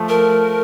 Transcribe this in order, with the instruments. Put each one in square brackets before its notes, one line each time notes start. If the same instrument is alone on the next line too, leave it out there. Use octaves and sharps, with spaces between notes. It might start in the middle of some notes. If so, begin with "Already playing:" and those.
Already playing: [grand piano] F3 A3
[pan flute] A#4